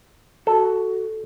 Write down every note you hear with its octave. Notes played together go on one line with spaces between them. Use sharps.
F#4 A4